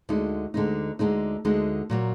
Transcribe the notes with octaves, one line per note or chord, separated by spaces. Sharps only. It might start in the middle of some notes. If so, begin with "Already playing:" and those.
D2 D3 G#3 D#4
D2 D3 G#3 D#4
D2 D3 G#3 D#4
D2 D3 G#3 D#4
A#2 F#3 A#3